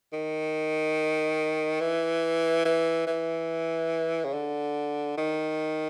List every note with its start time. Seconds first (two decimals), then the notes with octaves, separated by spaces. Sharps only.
0.13 D#3
1.80 E3
2.65 E3
3.07 E3
4.24 C#3
4.33 D3
5.17 D#3